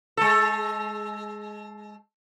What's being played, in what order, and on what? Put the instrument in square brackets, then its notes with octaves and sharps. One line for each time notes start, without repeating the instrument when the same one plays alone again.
[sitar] G#3 A4